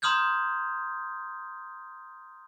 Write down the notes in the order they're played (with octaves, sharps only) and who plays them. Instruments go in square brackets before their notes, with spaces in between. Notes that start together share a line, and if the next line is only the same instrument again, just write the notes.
[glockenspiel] A#5 C6 D#6 F6 G6 G#6